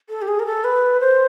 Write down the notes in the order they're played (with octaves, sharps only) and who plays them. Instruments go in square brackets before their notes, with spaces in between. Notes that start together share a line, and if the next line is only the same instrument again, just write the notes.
[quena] A4
G4
G#4
A#4
A4
B4
C5